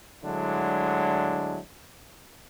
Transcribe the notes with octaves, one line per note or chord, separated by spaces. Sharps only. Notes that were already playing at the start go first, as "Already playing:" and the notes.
A2 D3 F#3 G#3 D4 E4